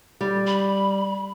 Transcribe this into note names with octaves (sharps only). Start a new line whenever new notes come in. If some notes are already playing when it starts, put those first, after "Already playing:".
G3
B5